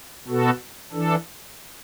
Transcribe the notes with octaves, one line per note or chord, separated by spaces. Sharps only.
B2 B3 F#4 A4
E3 D4 A4